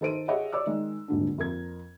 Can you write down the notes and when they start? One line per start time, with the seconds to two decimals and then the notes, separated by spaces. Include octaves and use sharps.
0.01 D#3 A4 C5 D7 D#7
0.28 G4 G#4 C#5 D#5 E5 F#5
0.52 C#5 D5 D6 E6
0.66 D#3 G#3
1.08 D#1 G#1 D3 D4
1.38 F2 A#4 G#6